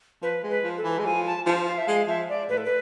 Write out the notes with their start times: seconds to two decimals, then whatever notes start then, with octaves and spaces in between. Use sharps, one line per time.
0.22 F3 B4
0.44 G#3
0.50 B4
0.64 F3
0.78 A4
0.84 E3
0.99 G#3
1.05 F3 G#5
1.26 A5
1.46 F3
1.67 F5
1.78 E5
1.87 G#3 F5
2.08 F3 E5
2.29 D5
2.49 A2 B4
2.57 A4
2.65 B4